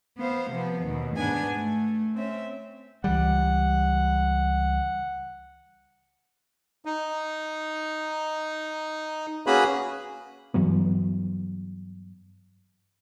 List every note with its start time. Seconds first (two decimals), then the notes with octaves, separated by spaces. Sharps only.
0.19 B3 C5 F5
0.51 C3 F3 B3
0.83 D#2 B2
1.16 G#2 B3 D4 G#5
1.56 A3
2.15 C4 C#4 E5
3.04 C#2 E3 G3 F#5
6.85 D#4
9.47 A#3 C#4 F#4 G#4 B4 B5
10.54 G2 E3 F#3 B3